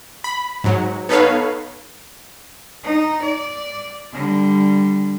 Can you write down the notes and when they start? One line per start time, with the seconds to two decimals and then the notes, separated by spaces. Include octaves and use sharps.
0.24 B5
0.64 G#2 F#3
1.09 B3 D#4 A4 B4 C#5 F5
2.83 D#4
3.22 D5
4.13 D3 G3